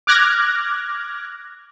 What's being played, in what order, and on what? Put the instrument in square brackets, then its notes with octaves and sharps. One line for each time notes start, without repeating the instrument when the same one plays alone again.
[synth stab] D6 F6 F#6 G#6 A#6